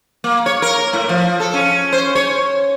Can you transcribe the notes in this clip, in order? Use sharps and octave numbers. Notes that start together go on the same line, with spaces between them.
A#3
C#5
A#4
A2
F3
A4
C#4
C5
C#5